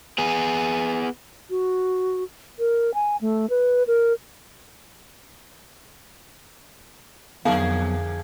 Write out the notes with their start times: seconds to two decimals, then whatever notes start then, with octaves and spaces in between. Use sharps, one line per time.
0.18 B3 G#4
1.50 F#4
2.59 A#4
2.94 G#5
3.21 A3
3.50 B4
3.87 A#4
7.45 F2 D3 F#3 B3 G#4 A#4 F5